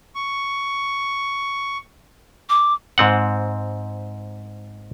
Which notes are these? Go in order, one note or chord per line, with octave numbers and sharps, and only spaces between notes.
C#6
D6
G#2 C4 F#5